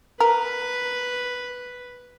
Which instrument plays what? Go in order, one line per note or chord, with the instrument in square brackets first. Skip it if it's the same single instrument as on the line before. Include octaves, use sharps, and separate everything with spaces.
[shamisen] A#4 [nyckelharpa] B4